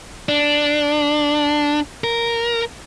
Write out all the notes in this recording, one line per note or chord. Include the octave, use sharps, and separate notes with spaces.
D4
A#4